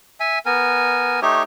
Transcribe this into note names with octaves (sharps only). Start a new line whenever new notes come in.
E5 G#5
B3 A#4 G#5
A3 D#4 G4 C#5